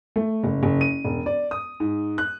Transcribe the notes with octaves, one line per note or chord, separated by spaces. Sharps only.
A3
F#1
F#1
D#7
E1
D5
D#6
G#2
F#6